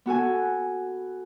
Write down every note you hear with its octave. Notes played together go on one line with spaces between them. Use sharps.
B3 F#4 A4 G#5